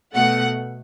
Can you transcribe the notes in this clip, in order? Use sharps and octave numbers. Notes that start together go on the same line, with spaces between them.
B2 A3 F#5